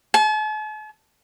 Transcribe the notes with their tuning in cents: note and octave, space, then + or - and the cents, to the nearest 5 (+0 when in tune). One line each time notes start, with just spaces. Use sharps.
A5 -45